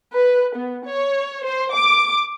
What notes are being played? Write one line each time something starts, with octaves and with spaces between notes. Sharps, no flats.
B4
B3
C#5
C5
D6